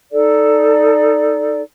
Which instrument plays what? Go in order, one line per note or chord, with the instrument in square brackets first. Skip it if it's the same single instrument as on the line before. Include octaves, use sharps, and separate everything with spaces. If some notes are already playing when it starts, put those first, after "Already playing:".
[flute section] D#4 A4 D5